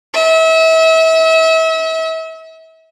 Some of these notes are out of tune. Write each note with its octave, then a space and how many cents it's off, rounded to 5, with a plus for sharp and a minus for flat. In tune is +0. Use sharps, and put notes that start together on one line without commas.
E5 -35